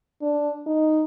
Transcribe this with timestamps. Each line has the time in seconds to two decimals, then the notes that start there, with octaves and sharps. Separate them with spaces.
0.22 D4
0.66 D#4